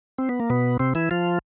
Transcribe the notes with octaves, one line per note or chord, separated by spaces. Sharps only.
C4
B3
A#3
B2 B3
C3 C4
E3 E4
F3 F4